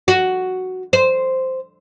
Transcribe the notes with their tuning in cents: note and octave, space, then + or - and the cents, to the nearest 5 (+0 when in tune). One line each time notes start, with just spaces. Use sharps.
F#4 +5
C5 -5